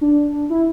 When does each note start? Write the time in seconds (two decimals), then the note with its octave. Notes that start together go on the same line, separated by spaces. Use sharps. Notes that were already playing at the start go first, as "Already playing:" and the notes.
0.01 D4
0.50 E4